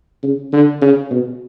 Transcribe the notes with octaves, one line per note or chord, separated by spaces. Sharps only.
C#3
D3
C#3
B2